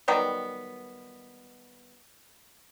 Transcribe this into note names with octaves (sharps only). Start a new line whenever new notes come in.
D#3 F#3 G3 B3